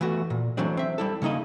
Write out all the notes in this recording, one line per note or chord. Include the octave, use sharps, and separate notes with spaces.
E3 A3 B3 F#4
A#2
E3 F#3 A3 C4 D4
C4 E5
G3 E4 A4
C#3 A#3 D#4 E4 D#5